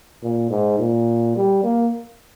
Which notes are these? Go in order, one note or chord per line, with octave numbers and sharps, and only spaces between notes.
A#2
G#2
A#2
G3
A#3